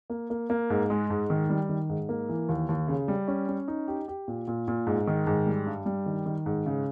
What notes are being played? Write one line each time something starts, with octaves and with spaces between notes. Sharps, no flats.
A#3
A#3
A#3
G#2
G#3
G#2
D#3
G3
D#3
G#2
A#3
E3
D#2
D#2
C#3
G3
C#4
C#4
D#4
G4
G4
A#2
A#2
A#2
G#2
D#3
G#2
G3
G2
G3
D#3
D#3
G#2
C#3